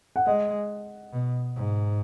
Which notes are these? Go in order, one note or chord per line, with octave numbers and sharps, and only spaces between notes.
F#5
G#3 D#5
B2
G#2